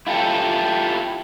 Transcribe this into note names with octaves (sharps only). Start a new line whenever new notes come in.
E4 F4 G4 A4